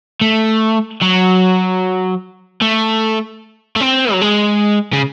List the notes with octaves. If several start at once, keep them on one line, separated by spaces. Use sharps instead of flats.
A3
F#3
A3
A3
C4
F#3
G#3
C#3